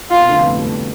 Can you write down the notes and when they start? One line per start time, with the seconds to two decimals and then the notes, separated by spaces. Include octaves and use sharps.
0.11 B2 F4
0.20 C3
0.29 D2 D3
0.37 F2 F3
0.42 B3
0.46 A2 A3
0.57 G3
0.64 A2 A3